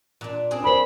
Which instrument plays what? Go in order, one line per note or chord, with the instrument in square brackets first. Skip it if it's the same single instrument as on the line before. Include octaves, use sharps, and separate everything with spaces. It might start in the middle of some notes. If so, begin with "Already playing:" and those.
[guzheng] A#2 D4
C4 D4 G#4
[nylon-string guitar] A#4 C5 [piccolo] B5